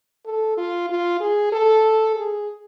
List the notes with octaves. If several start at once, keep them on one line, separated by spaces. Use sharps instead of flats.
A4
F4
F4
G#4
A4
G#4